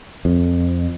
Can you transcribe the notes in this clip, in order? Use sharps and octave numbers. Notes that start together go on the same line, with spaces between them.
F2